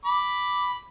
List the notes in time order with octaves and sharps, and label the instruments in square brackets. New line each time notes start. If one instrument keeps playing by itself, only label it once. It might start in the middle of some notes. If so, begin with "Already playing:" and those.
[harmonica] B5 D6